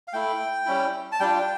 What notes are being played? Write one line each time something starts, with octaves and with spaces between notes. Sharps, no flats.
F5
A3 E4 G5
G3 C#4 E4
A5
G3 D4 F4 G5